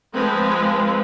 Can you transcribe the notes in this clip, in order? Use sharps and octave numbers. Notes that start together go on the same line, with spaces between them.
F3 G#3 C4 B4